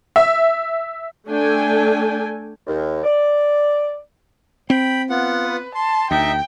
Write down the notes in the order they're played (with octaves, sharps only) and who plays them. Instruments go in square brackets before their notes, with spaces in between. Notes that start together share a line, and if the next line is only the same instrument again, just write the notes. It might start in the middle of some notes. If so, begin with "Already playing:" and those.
[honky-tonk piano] E5
[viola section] A3 D4 A4 G5 G#5
[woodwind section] D#2
D5
[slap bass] C4 [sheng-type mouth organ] G5 B5
[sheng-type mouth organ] B3 F4 F#5
[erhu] B4
[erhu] A5 [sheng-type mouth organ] C6
[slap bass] D2 [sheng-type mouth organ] D#4 D#5 E5 [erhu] G5